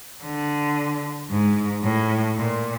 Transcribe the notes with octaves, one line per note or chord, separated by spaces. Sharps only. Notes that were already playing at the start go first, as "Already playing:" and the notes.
D3
G#2
A2
A#2